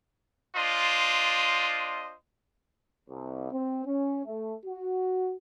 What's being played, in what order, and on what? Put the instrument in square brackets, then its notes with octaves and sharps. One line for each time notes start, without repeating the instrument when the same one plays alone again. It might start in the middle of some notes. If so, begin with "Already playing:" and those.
[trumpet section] D4 F4 C5 D#5
[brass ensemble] C2
C4
C#4
A3
F#4